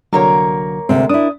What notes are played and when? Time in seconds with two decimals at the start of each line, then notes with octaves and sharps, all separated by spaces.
0.13 C2 D3 F#3 A#3 A#4 C#5
0.89 D2 C3 G#3 C4
1.09 D4 E4 D#6